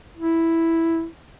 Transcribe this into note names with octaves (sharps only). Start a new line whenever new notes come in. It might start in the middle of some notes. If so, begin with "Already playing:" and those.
E4